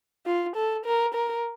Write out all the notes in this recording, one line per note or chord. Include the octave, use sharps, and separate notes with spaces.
F4
A4
A#4
A#4